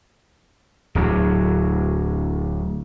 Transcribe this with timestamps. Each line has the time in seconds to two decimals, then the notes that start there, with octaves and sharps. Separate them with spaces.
0.95 D1 D2 F#3